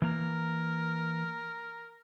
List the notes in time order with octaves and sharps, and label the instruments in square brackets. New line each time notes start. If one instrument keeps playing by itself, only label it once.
[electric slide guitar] E3 A#3 A#5 [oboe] A#4